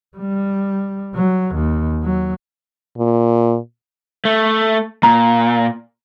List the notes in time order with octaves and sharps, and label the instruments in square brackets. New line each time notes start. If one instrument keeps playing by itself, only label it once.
[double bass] G3
F#3
D#2
F#3
[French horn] A#2
[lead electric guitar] A3
[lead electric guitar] A#2 [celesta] A#5